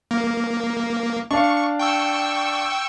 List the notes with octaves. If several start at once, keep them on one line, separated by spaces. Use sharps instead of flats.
A#3
D4 F5 C#6
G5 C#6 E6